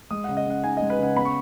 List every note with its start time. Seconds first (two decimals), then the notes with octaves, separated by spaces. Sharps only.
0.11 G#3 D#6
0.24 C#3 F#5
0.37 D#5
0.46 C#3 F#5
0.64 D#4 G#5
0.77 G#3 D#5
0.90 B4
0.99 C#3 F#5
1.16 B3 B5
1.25 C#6